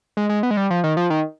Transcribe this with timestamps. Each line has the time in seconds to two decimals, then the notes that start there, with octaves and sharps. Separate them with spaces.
0.17 G#3
0.29 G#3
0.43 B3
0.51 G#3
0.57 G3
0.70 F3
0.84 D#3
0.97 F3
1.10 D#3